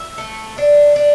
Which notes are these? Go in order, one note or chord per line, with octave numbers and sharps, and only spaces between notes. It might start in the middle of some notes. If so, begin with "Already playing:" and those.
Already playing: E5
A3
D4
D4